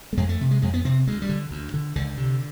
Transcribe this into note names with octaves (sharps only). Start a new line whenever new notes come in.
A3
F2 G#3
A3
C3
G#3
F2 G#3
B3
C3 C4
D2 G#3
G3
D3
D2
D3
C#2 D3
C3